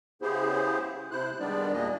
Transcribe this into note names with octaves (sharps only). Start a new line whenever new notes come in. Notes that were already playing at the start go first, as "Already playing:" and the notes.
C#3 B3 E4 G4 G#4 C5
C3 E4 C5 F#6
D#3 G3 G#3 B3 D4 D5
E2 A#2 E3 A#3 D4 D#5